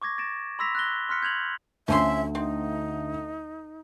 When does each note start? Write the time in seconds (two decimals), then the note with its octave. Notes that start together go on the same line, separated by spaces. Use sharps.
0.02 C#6 D6 G#6 A#6
0.18 A6 A#6 D7 E7
0.59 B5 C6 E6 A#6 B6 F7
0.75 F#6 A6 A#6 G7
1.09 C6 F6 F#6 B6 C#7
1.22 G6 G#6 F7 F#7
1.88 D2 F3 C#4 E5 C6
2.35 C4 D#4